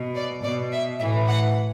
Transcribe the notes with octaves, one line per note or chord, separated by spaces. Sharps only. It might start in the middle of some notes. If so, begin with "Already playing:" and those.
Already playing: B2
D5
B2 D5
E5
A2 E3 E5
F#5